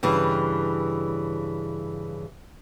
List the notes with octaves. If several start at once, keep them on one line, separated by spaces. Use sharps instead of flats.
G2 C#3 E3